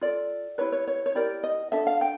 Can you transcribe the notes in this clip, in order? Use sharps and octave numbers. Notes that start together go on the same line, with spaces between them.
F4 A4 D5
E4 G4 B4 C#5
C#5
C#5
C#5
E4 G4 A#4 D5
D#5
D4 F4 A4 E5
F5
G5